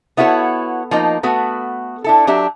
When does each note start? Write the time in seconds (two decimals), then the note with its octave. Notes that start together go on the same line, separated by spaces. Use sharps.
0.17 B3 E4 F#4 A4 A#4 C#5
0.91 F3 A#3 D#4
1.23 A3 B3 F#4
2.04 D4 E4 A4
2.27 F#3 D4 G4 E5